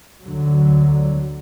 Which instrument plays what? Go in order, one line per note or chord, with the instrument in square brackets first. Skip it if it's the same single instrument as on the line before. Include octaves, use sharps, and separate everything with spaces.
[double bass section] D2 D3 F#3